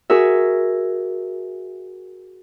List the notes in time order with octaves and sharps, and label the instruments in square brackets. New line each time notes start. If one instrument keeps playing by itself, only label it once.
[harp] F#4 G#4 A#4 E5